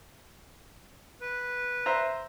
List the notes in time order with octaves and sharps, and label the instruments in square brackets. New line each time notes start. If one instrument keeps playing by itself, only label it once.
[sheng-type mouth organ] B4
[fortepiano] C5 E5 A#5